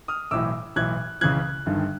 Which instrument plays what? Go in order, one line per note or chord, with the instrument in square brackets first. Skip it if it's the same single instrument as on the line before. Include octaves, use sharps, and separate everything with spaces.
[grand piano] D#6 F6
B1 A2 E3 D6 E6
B1 A2 E3 F#6 G#6
C#2 C#3 E3 F#6 G#6
G1 G2 D#3